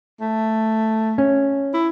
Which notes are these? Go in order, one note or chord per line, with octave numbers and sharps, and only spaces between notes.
A3
C#4
E4